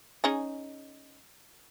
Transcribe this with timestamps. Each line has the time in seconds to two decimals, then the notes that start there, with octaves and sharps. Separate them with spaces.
0.24 C#4 D#4 G#4